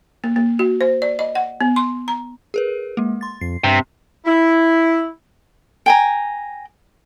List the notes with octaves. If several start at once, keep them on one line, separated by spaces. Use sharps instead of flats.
A#3
A#3
F#4
C5
D5
D#5
F#5
B3
C6
A#5
G#4 A#4 B4
G#3 A#3
C6 A6
F2 C7
G2 C3
E4
G5 G#5 A#5